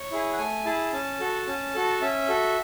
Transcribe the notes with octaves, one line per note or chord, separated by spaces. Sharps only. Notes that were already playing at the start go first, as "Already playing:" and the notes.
Already playing: C#5
E4 G#4
F#5
A3 G#5
E4 G#4 A5
C#4 A5
F#4 A4
C#4
F#4 A4
C#4 E5
F#4 A4